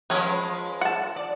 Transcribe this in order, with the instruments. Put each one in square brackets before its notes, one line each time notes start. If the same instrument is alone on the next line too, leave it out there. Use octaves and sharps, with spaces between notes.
[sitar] F3 G#3 [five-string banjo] C#4 G#4 B4
[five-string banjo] F#5 A5
[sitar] D5